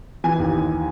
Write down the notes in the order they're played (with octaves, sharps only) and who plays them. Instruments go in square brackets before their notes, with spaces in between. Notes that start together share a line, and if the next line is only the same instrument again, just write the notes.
[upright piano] E3 G#5
D#2
D#2